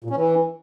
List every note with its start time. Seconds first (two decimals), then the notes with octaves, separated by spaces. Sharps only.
0.04 A#2
0.10 C#4
0.16 E3